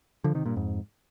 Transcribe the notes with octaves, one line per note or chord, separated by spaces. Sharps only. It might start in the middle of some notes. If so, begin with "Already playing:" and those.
D3 F3
C3 D#3
G2 A#2
F2 G#2